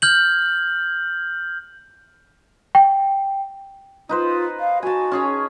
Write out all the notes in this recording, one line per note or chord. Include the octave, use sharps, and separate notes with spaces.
F6 G6 F#7
G5
D#4 F4 B4 C5
F5
F#4 G#5 A5
C#4 G#4 C#5